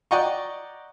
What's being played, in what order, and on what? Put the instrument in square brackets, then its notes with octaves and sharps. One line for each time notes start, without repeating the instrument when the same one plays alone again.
[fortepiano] D5 D#5 F#5 G5 A#5 C#6